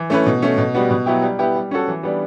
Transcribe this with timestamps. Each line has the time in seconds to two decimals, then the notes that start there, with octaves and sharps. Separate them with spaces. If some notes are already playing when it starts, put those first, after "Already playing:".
Already playing: E3
0.10 A3 C#4 E4 B4
0.26 B2
0.42 A3 C#4
0.58 B2
0.74 G3 B3 F#4
0.91 B2
1.06 F#3 B3 E4 G4
1.22 G3
1.39 B3 E4 G4
1.55 G3
1.71 C#4 F#4 A4
1.88 E3
2.03 G3 B3 D4